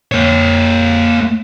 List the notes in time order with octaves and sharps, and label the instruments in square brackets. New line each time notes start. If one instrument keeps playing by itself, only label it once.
[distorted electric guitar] A#3 C#5